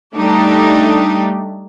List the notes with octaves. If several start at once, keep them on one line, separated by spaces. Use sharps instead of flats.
G3 A3 D4 D#4 G4